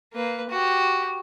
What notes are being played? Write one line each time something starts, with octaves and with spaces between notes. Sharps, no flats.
A#3 B4
F#4 G4